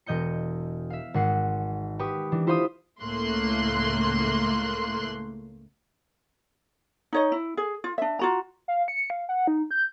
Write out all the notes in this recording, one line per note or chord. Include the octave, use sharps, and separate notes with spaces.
E1 D#5 G6 C#7
E5 F5
G#1 F#5 C7
G4 B4 C#6 D#6
E3 D4
E4 F4 C5 F5 B5 D#6
C#2 A2 A3 A#3 C6 F#6
D#4 C#5 D#5
E4
G#4
F4
D4 E5
F4 F#4 A#5
F5
C#7
F5
F#5
D#4
G6